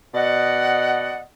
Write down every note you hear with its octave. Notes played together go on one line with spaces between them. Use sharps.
B2 D5 D#5 F#5